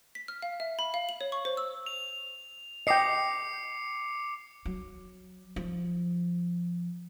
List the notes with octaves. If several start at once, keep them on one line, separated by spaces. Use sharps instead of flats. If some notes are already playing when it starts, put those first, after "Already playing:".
B6
F6
F5
E5
B5
F5
F#7
C#5
C#6
C5
E6
F7
D#5 G5 D6 C7 C#7
F#3
F3